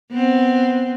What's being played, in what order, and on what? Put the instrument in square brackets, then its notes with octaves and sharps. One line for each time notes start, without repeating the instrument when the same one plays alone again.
[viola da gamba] B3 C4